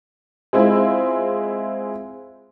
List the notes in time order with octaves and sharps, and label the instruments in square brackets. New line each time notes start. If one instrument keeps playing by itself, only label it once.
[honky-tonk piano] G#3 C4 E4 F4